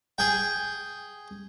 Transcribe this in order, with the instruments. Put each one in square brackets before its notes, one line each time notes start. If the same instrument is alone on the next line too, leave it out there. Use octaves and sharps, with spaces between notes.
[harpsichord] G#4 G5